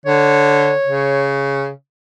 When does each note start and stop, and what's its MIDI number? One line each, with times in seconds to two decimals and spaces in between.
0.06 0.73 50
0.06 1.28 73
0.86 1.70 49